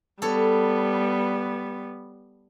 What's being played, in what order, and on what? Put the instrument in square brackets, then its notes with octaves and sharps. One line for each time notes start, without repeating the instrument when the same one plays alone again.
[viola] G3 B3 [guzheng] A4 C#5